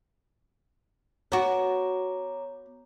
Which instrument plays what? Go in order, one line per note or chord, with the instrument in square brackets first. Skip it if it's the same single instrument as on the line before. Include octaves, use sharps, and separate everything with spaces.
[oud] B3 F#4 [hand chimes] C#5 A#5 D6